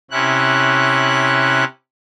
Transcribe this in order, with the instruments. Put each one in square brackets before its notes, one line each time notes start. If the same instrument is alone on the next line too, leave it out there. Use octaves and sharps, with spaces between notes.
[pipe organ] C3 C#4 E4 F#6